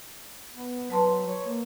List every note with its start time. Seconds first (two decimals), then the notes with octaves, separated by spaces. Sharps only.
0.52 B3
0.90 F#3 B4 A5 C6
1.27 C#5
1.46 A#3